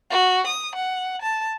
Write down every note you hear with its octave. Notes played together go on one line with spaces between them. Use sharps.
F#4
D#6
F#5
A5